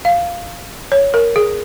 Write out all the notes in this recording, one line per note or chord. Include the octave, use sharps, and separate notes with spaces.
F5
C#5
A#4
G#4